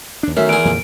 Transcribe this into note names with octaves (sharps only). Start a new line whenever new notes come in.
D#2 D4
F#2 D#3 F#3 A3 A#4 E5
E2 G#4 D7
F2 A#2 D3